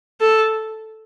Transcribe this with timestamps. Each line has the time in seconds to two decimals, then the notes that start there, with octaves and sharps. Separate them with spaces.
0.21 A4